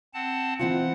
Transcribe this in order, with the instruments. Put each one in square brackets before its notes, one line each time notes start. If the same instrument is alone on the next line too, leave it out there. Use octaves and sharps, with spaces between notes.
[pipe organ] C4 F#5 A5
[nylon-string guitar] E3 C4 F4 [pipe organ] F#5